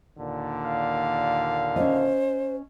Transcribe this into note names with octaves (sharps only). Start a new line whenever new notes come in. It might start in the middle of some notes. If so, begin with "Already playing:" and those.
D#2 A#2 D3
F5
C#4 C5 D#5